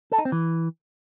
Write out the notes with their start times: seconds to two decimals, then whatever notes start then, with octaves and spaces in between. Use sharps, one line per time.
0.12 A4
0.18 D#4
0.25 C4
0.32 E3